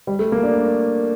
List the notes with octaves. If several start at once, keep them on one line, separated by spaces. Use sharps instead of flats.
G3
A3
A#3
D4